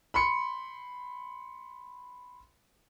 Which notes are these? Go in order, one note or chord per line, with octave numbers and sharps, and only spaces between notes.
B5 C6 C#7